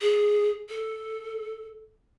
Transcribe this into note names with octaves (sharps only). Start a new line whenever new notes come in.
G#4
A4